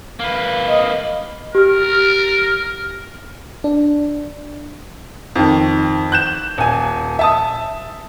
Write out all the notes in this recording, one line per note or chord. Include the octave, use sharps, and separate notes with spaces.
A#3 B4
D#5
G4 A#4 F6
D4
F2 D#3
F#6 G6 E7
D#1 G#5
E5 A5 D#6